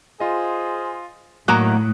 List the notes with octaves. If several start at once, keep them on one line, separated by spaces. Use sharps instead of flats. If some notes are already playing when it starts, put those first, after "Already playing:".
F4 G#4 C5 D#5
A2 D#3 F#3 A#3 A#5 C#6 D#6 F#6